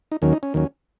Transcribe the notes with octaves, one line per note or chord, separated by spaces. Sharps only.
D#4
D#2 D#3 F#3 C#4
D#4
C#4
D#2 D#3 F#3 C#4